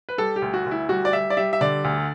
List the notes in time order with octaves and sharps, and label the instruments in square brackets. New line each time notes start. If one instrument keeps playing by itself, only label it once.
[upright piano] B4
G3 A4
G4
D2
F#4
D2
E4
G3 F#4
D5
G3 E5
D5
G3 E5
E5
D3 D5
D2